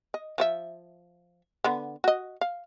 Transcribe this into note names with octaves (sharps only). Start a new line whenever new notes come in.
D#5
F3 C5 E5
D3 B3
F#4 D#5
F5